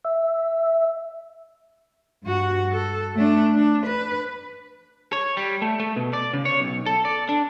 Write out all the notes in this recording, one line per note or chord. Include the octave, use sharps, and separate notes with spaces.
E5
G2 F#4
A4
A3 D4
D4
B4
C#5
G3
A3
A3
B2
D5
C#3
C#5
B1
A4
D5
D4